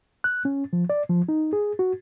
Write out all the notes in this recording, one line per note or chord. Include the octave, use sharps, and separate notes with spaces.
F#6
C#4
F3
D5
F3
D#4
G#4
F#4